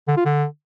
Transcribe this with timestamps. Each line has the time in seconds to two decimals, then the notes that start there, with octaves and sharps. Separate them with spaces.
0.08 D3
0.17 F4
0.25 D3